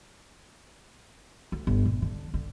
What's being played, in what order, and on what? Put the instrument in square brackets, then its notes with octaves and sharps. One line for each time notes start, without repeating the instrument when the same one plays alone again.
[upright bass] D2
G1
A#2
D3
D3